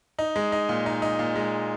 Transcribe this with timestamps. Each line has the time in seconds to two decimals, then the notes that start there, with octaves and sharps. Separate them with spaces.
0.19 D#4
0.36 G#3
0.52 D#4
0.69 A#2
0.86 D#4
1.02 D#4
1.19 A#2
1.36 G#3